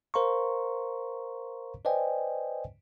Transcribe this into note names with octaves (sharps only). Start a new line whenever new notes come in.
A#4 C5 F5 A#5 C6 C#6
B4 C5 D5 D#5 G5 G#5